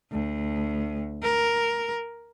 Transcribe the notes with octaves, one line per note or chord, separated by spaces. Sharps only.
D2
A#4